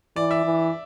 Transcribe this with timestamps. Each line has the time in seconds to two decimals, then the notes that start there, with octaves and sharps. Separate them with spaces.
0.16 E3 D5
0.31 E5
0.45 E3